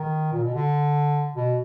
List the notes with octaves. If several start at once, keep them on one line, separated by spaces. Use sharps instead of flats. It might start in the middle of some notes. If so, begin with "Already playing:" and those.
Already playing: D#3
A#2
B2
D3
B2